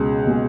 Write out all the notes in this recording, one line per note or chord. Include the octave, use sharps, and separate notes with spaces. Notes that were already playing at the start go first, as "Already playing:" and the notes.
Already playing: C#2 B2 G#3
B2 G#3